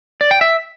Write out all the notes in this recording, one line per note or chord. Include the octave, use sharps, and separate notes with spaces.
D5
G5
E5